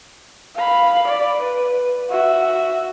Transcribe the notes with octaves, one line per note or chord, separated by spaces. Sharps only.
F5 B5
D5
B4
F#4 E5